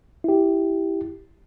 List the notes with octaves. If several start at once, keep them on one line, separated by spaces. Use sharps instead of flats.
E4 G4